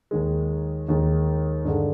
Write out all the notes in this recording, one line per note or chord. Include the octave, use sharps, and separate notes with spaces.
D#2 D#3 G#3
D#2 D#3 G#3
G2 D3 G#3